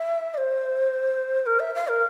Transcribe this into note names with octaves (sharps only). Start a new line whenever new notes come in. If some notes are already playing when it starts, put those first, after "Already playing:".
Already playing: E5
D5
C5
A#4
E5
F5
A#4